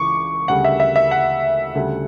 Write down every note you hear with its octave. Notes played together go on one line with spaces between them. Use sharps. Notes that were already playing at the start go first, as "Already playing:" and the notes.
Already playing: C#2 C#3 E3 C#6 D6
D2 C#3 G3 F#5
E5
E5
E5
F#5
D2 C#3 G3